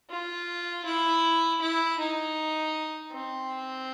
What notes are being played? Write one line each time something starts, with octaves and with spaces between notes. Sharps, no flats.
F4
E4
E4
D#4
C4